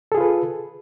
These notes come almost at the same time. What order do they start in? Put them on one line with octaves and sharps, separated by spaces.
A4 G#4 F4 B4